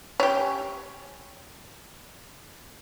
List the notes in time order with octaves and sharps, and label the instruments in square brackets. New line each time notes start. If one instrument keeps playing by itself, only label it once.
[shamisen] C#4 G4